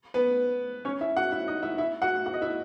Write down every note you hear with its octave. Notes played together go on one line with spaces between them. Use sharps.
B3 B4
C#4 C#5
E4 E5
F#4 F#5
E4 E5
D#4 D#5
E4 E5
E4 E5
F#4 F#5
F#4 F#5
D#5
E4 E5